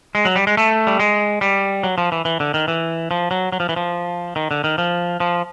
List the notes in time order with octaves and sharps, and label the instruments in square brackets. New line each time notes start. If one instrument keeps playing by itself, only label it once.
[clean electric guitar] G#3
F#3
G3
G#3
A3
G3
G#3
G3
F#3
F3
E3
E3
D3
D#3
E3
F3
F#3
F#3
F3
E3
F3
D#3
D3
D#3
F3
F3